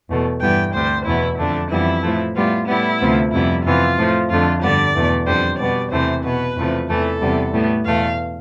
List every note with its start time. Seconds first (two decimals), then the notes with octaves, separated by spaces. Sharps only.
0.09 E2 B2 A3
0.41 G2 E3 G3 B3 G5
0.74 D2 C3 G3 C5
1.06 E2 B2 B3 E4
1.39 F2 D3 A3 D4
1.70 F2 E3 G3 B3 E4
2.03 A2 F3 A3
2.36 A2 G3 B3 F4
2.68 A2 G3 B3 E4
3.00 D2 C3 F3 B3
3.32 F2 C3 G3 B3 E4
3.64 F2 C3 E3 B3 F4
3.98 A2 F3 A3
4.30 F2 D3 A3 F4
4.62 G2 D3 G3 B3 D5
4.95 E2 B2 A3
5.27 F2 D3 G3 C5
5.59 B2 G3 B3 D5
5.91 E2 C3 E3 A3 C5
6.24 B2 B3 B4
6.56 E2 C3 F3 A3
6.89 E2 C3 E3 A3 A4
7.21 E2 C3 G3 B3
7.53 A2 G3 B3
7.85 E2 B2 A3 F5